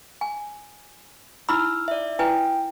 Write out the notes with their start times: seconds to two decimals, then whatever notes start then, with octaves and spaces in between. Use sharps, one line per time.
0.21 G#5
1.49 D#4 E4 B5 E6 F6
1.88 D5 E5
2.19 E4 B4 G5 G#5